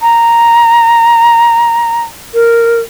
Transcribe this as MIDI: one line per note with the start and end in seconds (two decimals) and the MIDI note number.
0.01 2.02 82
2.34 2.80 70